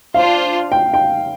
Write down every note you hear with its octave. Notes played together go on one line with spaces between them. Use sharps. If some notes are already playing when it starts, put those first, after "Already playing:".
D4 F4 C5 F5
G5
G5